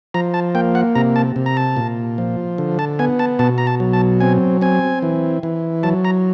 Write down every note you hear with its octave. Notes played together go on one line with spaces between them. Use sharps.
F3 A#5
A5
A#3 G5
F#5
C3 A#5
A5
C3
A#5
A5
A#2
F3
D3
A5
B3 G#5
A5
B2 A5
A#5
A5
F#3
A5
C4 G#5
C4 G#5
E3
E3
F#3 A5
A#5